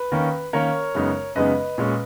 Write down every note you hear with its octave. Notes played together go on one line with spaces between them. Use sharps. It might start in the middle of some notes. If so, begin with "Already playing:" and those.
Already playing: B4
D#3 A#3 C#4
D#3 A#3 C#4 A#4 C#5
F#2 C#3 G#3 B3 D#4
F#2 C#3 G#3 B3 D#4 B4 D#5
A#2 G#3 C#4